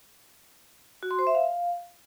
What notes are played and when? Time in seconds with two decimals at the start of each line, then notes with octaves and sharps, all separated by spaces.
1.03 F#4
1.11 C6
1.19 C5
1.27 E5
1.35 F5